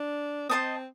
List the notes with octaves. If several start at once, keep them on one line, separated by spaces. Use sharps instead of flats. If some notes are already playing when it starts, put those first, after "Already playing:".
Already playing: D4
C4 C5 D#5 A5 D#6